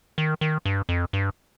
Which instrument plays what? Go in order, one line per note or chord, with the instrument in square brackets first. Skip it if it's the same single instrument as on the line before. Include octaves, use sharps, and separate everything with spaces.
[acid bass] D#3
D#3
G2
F2
G2